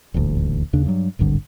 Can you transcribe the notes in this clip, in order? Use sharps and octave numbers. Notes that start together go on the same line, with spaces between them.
D#1 A1 D2
D#2 C#3 D4
G2 F#3
D1 G#1 G2 D3